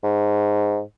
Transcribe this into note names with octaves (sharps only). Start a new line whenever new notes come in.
G#2